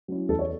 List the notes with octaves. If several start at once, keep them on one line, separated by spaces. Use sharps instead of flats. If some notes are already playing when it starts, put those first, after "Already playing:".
F#3 C#4 E4
E2 A4
C#5